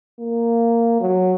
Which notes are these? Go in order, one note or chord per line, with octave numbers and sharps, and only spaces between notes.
A#3
F#3